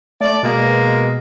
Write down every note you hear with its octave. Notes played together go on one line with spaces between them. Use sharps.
A3 D5
B2 G#3 A#3